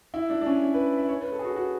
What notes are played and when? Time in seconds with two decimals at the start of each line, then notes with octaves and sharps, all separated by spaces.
0.14 E4
0.30 D4
0.41 D4
0.46 C#4
0.62 C#4
0.74 B4
0.97 E5
1.09 C#5
1.21 B4
1.32 A4
1.39 G#4
1.45 F#4
1.56 F#4